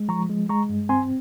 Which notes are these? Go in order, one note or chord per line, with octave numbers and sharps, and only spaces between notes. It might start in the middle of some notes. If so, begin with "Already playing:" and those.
Already playing: G#3
F3 A#5 C#6
G#3
G#3 A#5 C#6
G2
C4 G#5 C6